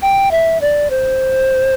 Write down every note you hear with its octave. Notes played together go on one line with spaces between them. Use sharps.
G5
E5
D5
C5